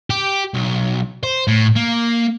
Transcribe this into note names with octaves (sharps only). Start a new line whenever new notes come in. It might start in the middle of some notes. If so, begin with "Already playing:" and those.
G4
B1
C5
A2
A#3